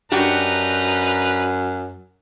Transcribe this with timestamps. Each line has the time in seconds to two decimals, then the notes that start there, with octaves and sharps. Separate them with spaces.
0.12 F#2 D4 D#4 F#4 G4 B4 A#5